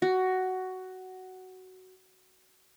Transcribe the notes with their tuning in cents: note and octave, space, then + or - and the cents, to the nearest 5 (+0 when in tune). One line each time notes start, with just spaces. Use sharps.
F#4 +10